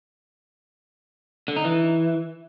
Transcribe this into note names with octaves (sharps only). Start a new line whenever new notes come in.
D3
D#4
E3